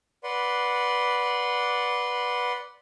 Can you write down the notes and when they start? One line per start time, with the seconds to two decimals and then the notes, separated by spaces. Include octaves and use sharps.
0.24 B4 D5 F#5 C6